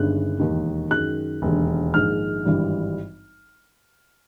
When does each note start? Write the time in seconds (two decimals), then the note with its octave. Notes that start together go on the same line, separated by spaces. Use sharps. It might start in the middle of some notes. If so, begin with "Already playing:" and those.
Already playing: G1 G2 D#3 G#3 C#4 F#6
0.39 E1 D#2 D#3
0.91 F#2 D#3 G#3 F#6
1.42 E1 D#2 D3
1.94 A#1 G#2 D#3 G#3 F6
2.45 G#1 G2 E3 G3